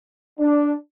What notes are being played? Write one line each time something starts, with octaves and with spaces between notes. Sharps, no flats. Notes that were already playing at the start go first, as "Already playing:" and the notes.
D4